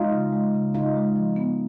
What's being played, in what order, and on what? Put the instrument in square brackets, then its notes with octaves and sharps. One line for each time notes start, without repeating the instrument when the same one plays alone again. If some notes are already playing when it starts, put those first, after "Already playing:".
Already playing: [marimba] G#3 [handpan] D#4 F4
[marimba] C#3
G#3
C#3
[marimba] C#3 [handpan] D#4 F4
[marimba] G#3
F3
B3